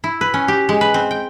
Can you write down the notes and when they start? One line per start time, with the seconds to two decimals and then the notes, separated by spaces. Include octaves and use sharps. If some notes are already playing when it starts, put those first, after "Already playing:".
0.04 E4
0.21 B4
0.34 C#4
0.48 G4
0.69 G#3
0.81 B4
0.94 C4
1.11 G5